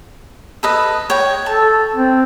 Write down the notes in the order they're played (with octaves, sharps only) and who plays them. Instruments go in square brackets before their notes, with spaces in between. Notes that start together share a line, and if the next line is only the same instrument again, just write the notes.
[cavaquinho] A4 B4 D#5
C#5 G5
[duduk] A4 [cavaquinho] A5
[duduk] C4